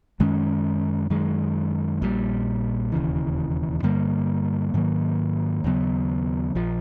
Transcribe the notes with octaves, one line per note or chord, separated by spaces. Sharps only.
F#2 D#3 G#3 C#4
F#2 D#3 G#3
A#1 A#2 G3
E1 D#2 C#3 E3
G2 D3 G3 A#3
G#2 D#3 F#3 A#3
D#2 C#3 F#3 B3
A#1 F3